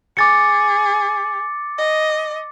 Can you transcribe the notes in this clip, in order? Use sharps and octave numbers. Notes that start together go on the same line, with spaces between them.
G#4 D6 A6 C#7
D#5